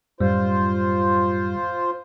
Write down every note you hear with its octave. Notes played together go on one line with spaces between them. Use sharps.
F#2 A2 G3 F4 C5